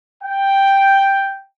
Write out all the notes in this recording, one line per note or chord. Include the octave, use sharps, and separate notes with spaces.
G5